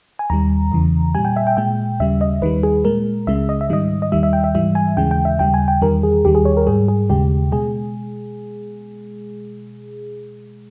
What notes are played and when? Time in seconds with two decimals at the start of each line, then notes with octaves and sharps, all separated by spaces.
0.19 G#5
0.30 D#2 D#3 G3 A#5
0.72 E2 C#3 E3
1.15 A#2 G3 G#5
1.25 G5
1.36 E5
1.47 G5
1.57 A#2 G#3 G5
2.00 D#2 C#3 G3 E5
2.21 D#5
2.42 D#2 D#3 G3 B4
2.63 G#4
2.85 A#2 G#3 A#4
3.27 C#2 C#3 G#3 E5
3.49 D#5
3.61 E5
3.70 G#2 D#3 G3 D#5
4.02 D#5
4.12 D#2 D#3 G3 E5
4.23 E5
4.33 G5
4.44 E5
4.55 G#2 E3 G3 E5
4.75 G#5
4.97 D#2 C#3 E3 G#3 G5
5.11 G5
5.25 E5
5.39 D#2 C#3 G3 G5
5.54 G#5
5.68 G5
5.82 E2 D#3 G3 A#4
6.03 G#4
6.25 D#2 D#3 G3 G4
6.35 G#4
6.45 C#5
6.57 A#4
6.67 G#2 G3 G#4
6.88 G#4
7.10 D#2 C#3 G#3 G4
7.52 B2 G#3 G#4